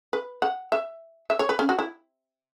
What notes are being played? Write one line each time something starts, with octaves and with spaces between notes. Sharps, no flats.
B4
F#5
E5
E5
C#5
B4
C#4
F#4
E4